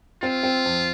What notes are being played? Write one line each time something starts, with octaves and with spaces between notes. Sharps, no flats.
C4 F4
C4
F2